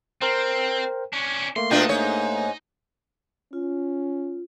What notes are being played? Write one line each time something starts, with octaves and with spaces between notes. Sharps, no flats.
C4 A#4 C5 G5
C#4 D4
A3 A#3 C6
B2 D4 D#4 F4
G#2 C#5
C#4 F4